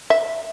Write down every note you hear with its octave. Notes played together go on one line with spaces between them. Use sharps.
E5